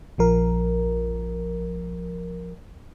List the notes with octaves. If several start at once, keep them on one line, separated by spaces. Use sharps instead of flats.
A#1 F3 A#4